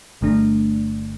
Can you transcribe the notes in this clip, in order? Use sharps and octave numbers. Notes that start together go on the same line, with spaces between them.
G1 G2 D3 A3 D4